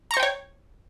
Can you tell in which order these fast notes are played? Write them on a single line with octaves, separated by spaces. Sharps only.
A#5 C#6 C5 G5 C#5